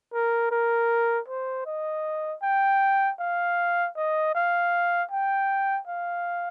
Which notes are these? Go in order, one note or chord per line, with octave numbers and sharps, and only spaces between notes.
A#4
A#4
C5
D#5
G5
F5
D#5
F5
G5
F5